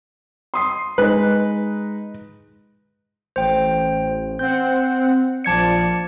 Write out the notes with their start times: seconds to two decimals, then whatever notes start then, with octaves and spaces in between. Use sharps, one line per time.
0.54 C6 D#6 C7
0.98 G#3 D#4 B4
3.36 A1 C5 G5
4.39 C4 F#5 G6
5.44 A#1 F3 D5 A5 G#6 C#7